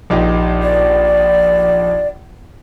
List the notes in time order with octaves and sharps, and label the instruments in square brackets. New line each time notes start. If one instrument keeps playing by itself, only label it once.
[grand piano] A#1 D#4 G4
[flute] D5